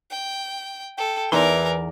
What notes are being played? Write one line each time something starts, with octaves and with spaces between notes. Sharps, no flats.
G5
A4 G5
E2 E3 D#4 A#4 D5 C6